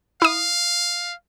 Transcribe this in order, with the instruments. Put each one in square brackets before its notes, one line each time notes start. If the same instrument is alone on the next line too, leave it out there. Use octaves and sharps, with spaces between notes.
[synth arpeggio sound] E4 D#6 [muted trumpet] F5